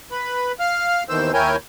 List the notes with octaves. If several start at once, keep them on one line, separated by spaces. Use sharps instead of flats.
B4 B5
F5 F6
D#2 B2 D#3 E3 C5 E6
D#2 E4 A#4 C#5 G5 G#5